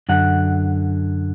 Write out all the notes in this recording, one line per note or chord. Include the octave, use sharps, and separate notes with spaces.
F#2 D3 F#5